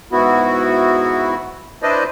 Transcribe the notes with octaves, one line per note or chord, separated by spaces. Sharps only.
G#2 B3 E4 F#4
D4 E4 B4 C5 D5 D#5